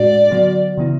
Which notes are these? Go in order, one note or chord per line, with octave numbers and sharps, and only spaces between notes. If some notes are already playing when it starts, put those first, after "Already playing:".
Already playing: A2 G#3 D4 F#4 D5
D3 F#3 B3 F#4
C#3 E3 B3 E4